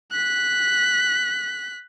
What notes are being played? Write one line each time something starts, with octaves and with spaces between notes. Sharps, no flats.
F#6 B6